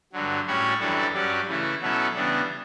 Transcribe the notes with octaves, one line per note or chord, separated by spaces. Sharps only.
G2 D3 F#3
A2 G3 C#4 F#4 C#5
F#2 E3 G3 D4 A4
G2 F#3 C#4 G4 D5
C#3 E3 A3 E4
B2 F#3 C#4 E4 A4
C#3 E3 G3 B3 D4